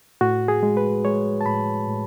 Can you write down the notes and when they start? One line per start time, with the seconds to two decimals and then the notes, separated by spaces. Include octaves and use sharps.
0.21 A2 F#4
0.48 G#4
0.63 G#3
0.77 B4
1.05 G#3 C#5
1.41 A5
1.46 A2 B5
1.88 A2